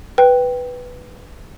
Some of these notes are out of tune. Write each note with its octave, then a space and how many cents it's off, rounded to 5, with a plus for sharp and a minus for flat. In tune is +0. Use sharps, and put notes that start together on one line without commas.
B4 +0 G5 +0